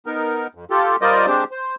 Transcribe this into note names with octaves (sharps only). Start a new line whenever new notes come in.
B3 D#4 A#4
F2
F4 G4 A4
G3 F4 A#4 C5 D5 D#5
G#3 C4 D4 G4 C5
C5